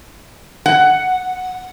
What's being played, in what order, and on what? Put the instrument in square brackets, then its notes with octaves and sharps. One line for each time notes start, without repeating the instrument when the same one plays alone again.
[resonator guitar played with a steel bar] F#5